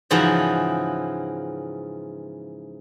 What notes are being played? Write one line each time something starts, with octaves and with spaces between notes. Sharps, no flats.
G#2 C#3 E3 F3 E4 F#4